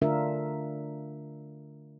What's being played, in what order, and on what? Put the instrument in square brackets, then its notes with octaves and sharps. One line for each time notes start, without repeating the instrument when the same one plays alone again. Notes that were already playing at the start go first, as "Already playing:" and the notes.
[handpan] D3 A3 D4 F4 A#4 E5